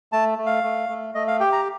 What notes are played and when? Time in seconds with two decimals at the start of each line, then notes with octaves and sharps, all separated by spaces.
0.12 A3 A5
0.38 A3
0.46 F5
0.63 A3
0.89 A3
1.14 A3 D#5
1.28 F5
1.40 G4 G5
1.52 A#5